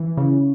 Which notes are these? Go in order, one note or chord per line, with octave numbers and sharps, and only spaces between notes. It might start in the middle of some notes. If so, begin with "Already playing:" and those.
Already playing: E3
C#3